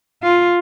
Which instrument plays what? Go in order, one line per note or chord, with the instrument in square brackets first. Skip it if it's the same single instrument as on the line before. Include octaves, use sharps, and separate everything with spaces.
[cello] F4